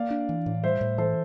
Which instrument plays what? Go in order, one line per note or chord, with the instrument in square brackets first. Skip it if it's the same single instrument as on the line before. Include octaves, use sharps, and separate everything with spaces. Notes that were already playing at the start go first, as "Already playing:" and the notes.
Already playing: [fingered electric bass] A#3 [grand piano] D5 F5
[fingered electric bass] D4
E3
A2
[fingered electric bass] G3 [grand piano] C5 E5
[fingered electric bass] A2
[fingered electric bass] E3 [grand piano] A4 C5